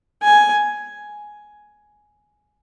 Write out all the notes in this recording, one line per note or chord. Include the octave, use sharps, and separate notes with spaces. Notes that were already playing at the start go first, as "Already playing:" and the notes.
G#5